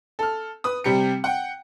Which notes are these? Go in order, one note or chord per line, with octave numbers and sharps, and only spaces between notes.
A4 F6
B4 D#6
C3 G3 G4 C#7
F#5 G5